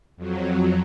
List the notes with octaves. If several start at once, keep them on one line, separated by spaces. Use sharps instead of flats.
F2 F#3